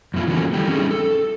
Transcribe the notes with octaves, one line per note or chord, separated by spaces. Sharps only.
F#2 B2 E4 F4
D3 E3 F3 A#3 C#4 F#4
G3 E4 G4 A4
C#4 D#4 E4 G4 G#4
A4